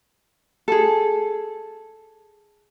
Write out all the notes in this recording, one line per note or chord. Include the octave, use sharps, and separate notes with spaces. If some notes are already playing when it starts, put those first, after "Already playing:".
G#4 A4